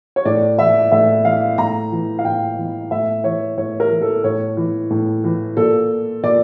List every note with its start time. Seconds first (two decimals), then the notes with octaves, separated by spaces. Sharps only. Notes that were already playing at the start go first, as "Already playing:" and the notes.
0.16 C#5
0.25 A2 D5
0.58 E3 E5
0.92 A2 E5
1.25 E3 F5
1.58 A2 A#5
1.92 E3
2.19 F5
2.24 A2 G5
2.58 E3
2.91 A2 E5
3.24 E3 C#5
3.57 A2 C#5
3.80 A#4
3.91 E3
4.02 A4
4.24 A2 C#5
4.57 E3
4.90 A2
5.24 E3
5.57 A#2 A4
6.23 A#2 D5